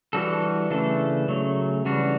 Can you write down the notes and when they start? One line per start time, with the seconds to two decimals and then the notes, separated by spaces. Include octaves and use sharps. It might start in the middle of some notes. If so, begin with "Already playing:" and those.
0.13 E3 G3 D4 F#4 A4
0.71 C#3 E3 A3 D4 A4
1.28 C#3 F#3 A3
1.85 C#3 E3 G3 D4 F#4